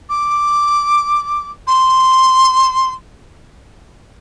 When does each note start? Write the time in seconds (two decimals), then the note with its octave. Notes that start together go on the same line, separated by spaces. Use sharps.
0.09 D6
1.67 C6